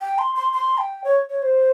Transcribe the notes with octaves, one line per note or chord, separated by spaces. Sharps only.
G5
C6
C6
C6
G5
C#5
C#5
C5